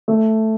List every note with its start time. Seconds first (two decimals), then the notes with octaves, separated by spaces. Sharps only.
0.08 A3